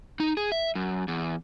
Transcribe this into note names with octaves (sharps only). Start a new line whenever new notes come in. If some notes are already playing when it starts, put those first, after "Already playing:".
D#4
G#4
E5
F#2
E2